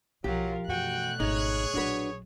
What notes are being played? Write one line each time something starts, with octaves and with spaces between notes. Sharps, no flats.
B1 F3 F#3 F4 G4 A#4
F#2 B2 E3 A3 F#4 G5 F#6
G#1 D#4 G#4 C#5
A#1 F#3 D4 F#4 B4